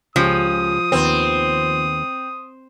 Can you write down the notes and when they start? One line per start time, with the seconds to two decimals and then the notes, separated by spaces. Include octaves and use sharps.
0.16 C#2 F3 C#4 G4 D#6
0.92 D#2 B3 C4